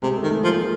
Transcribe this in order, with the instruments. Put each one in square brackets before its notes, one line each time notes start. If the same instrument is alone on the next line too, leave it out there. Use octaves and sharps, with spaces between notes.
[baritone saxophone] C3 [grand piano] G#3
[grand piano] A3
[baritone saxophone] D#3
[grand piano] G#3
[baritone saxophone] F3 [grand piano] A#3